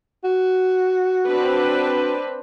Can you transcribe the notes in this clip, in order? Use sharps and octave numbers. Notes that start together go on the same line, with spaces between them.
F#4
C4 D4 B4